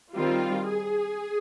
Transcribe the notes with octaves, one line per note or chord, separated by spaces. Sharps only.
D#3 G3 C4 F4
G#4